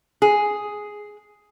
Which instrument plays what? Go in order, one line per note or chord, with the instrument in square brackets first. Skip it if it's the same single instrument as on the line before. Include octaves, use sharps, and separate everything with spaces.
[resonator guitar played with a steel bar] G#4